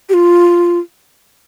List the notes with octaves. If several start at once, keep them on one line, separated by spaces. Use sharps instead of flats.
G4
F4